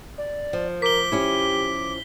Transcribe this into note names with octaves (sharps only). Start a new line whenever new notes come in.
D5
F3
A#4 D6 B6 G7
F3 C#4 E4 G4